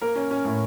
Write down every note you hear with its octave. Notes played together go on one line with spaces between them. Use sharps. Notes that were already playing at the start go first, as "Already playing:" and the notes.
A#3 A#4
C#4
C#4
A2